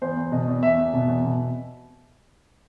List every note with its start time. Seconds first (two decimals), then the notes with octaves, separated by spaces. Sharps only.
0.02 E2 C5
0.17 E2
0.32 B2 D#5
0.47 E2
0.63 E2 E5
0.78 E2
0.93 B2
1.08 E2
1.24 B2